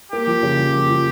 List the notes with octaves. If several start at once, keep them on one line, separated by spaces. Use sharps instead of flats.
A#3 G4
F3
C#3
F3
A#3
F3